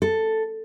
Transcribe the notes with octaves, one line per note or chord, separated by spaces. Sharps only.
A4